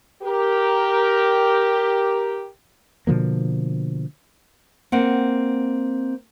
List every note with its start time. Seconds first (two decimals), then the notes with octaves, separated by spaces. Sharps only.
0.23 G4 A#4
3.07 B2 D3 F3 A#3
4.92 A#3 C4 F#5